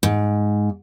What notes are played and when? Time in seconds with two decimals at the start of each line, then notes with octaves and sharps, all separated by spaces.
0.03 G#2